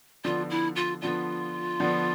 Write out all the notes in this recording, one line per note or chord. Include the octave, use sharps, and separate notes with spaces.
D3 F3 B3 D4 F4
E4
F4
D3 F3 B3 D4 F4
D3 F3 B3 D4